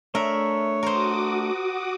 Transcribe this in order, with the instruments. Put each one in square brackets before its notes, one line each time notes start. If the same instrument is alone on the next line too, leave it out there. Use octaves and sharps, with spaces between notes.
[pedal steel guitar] A3 D4 E5 [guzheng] A#4 [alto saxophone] C#5
[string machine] F#4 D6 D#6 [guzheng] A#4 C5